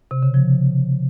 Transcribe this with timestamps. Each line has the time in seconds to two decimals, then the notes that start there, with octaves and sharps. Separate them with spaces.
0.11 C3
0.23 C#3
0.34 F3